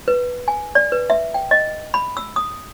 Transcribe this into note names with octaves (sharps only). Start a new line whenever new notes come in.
B4
G#5
D5
B4
E5
G5
D#5
B5
E6
D#6